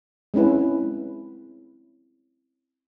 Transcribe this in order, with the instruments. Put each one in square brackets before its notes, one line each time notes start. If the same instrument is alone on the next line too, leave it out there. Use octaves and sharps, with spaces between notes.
[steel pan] G#3 C4 C#4 E4 B4